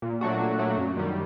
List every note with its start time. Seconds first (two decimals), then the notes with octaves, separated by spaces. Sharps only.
0.02 A#2
0.21 F#3 A3 D4 F#4
0.40 A#2
0.59 F#3 A3 D4 F#4
0.77 F#2
0.97 D#3 G3